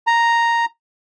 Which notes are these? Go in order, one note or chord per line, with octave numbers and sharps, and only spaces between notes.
A#5